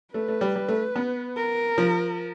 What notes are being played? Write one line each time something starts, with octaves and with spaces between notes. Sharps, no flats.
A3 B4
A3
G3
G3
A3
B3
A#4
F3